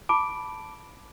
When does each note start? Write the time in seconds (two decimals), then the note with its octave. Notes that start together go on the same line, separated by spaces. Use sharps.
0.09 A5 B5 D6 D7